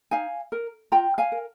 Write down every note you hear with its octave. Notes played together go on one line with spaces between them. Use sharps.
D#4 F5 G#5
A#4
F4 G5 A#5
F5 G#5
A#4